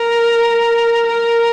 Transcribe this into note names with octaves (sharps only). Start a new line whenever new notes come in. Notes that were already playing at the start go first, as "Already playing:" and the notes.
Already playing: A#4
A#4